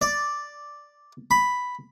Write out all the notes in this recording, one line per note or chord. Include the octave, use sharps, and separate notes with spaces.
D5
B5